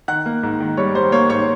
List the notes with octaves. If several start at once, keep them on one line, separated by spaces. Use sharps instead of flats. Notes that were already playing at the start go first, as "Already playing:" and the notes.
D#3 F#5 F#6
A#3
G#2
D#3
G3 C#5 C#6
G3 C5 C6
A#3 C#5 C#6
G#2 C#5 C#6